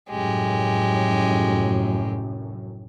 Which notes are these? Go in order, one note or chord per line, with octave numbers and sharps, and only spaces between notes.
F1 F#2 A2 G#3 G4